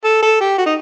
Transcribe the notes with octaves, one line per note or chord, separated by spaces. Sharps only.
A4
A4
G4
F#4
D#4